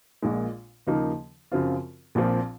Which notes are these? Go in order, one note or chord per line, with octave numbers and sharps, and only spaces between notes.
A#1 A#2 G#3
D#2 C#3 F3 A#3 D#4
F#2 C#3 F3 C4 F4
A#1 A#2 F3 C4